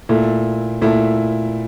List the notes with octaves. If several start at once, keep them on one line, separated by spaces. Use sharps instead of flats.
A#2 A3 E4
A#2 A3 E4